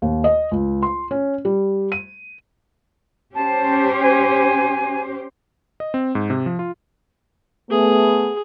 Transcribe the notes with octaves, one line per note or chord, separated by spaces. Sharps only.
D#2
D#5
C#2
C6
C#4
G3
D#7
C#4 G4 C5 A5
G#5
D#5
C4
G#2
C3
F3
F4
A3 B3 G#4